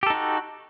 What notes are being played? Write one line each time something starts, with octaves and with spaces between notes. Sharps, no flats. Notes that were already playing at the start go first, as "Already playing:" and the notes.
D#4 F#4 G4 A4